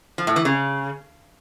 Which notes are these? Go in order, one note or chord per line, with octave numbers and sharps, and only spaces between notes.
F3
A2
E3
C#3